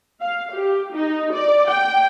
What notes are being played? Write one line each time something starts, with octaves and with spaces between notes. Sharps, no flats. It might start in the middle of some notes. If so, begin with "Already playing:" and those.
F5
G4
D#4
D5
G5